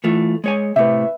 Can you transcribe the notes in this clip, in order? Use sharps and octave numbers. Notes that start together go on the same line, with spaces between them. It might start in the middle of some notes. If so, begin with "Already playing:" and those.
E3 A3 F4
G#3 C#5 G#5
A2 C3 B4 E5